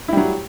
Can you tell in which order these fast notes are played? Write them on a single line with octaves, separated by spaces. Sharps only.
E4 G3 F#3